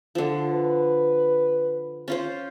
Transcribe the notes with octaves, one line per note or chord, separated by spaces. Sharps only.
D3 F3
B4
C#4 F4 C5